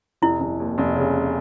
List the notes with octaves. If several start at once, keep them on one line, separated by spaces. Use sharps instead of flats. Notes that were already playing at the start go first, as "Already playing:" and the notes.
F1 E4
F1
D#2
F1
C#3